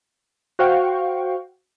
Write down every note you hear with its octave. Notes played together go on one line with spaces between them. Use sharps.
F#4 C5 F5 G5 C#6